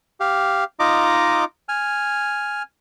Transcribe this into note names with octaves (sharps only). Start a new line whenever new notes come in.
G4 F5
D#4 F4 D#5 A#5 D6
G#5 F6